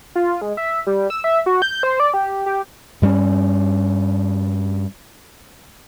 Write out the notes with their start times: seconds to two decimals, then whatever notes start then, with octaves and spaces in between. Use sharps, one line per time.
0.16 F4
0.42 G#3
0.57 E5
0.87 G3
1.10 E6
1.24 E5
1.46 F#4
1.62 G6
1.83 C5
2.00 D5
2.14 G4
2.46 G4
3.02 G2 G3 A3 C#4